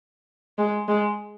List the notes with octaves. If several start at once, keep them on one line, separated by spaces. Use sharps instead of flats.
G#3
G#3